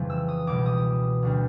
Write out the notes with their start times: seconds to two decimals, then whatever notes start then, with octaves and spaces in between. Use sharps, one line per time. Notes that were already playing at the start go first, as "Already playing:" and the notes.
Already playing: F2 C#3 E3 G3
0.10 E6
0.28 D#6
0.47 C#2 B2 G3 D6
0.66 D#6
1.23 D2 D3 G3